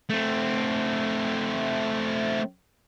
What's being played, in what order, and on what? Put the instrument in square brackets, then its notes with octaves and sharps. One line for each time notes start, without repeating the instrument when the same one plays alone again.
[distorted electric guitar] A3 C4